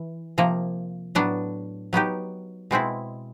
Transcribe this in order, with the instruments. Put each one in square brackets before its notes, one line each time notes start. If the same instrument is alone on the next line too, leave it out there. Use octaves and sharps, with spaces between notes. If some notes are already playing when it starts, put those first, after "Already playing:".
Already playing: [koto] E3
C3 F3 A#3
A2 F#3 B3 D4
F#3 B3 D#4 G4
B2 G#3 C4 E4